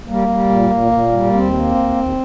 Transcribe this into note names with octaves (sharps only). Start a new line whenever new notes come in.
G3 A#3
G3
A#2
A#2
A#2
G3
D#2 C4
A#3
D#2
D#2